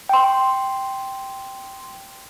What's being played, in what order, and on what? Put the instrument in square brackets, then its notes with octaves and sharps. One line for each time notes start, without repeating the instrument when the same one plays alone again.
[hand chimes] G5 C6